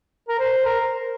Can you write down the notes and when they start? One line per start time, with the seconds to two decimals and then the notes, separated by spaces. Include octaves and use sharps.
0.28 A#4
0.39 C5
0.65 A#4